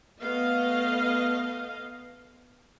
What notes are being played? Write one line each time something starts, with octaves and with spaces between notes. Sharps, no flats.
A3 B3 D#5 F5